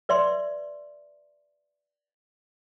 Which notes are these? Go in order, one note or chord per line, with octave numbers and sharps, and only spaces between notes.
B4 D5 E5 C6